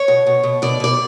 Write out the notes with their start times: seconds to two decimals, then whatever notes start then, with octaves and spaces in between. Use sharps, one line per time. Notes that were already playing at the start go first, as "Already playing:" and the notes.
Already playing: C#5
0.08 B2
0.27 B2
0.43 B2
0.62 B2 D5
0.80 B2 D5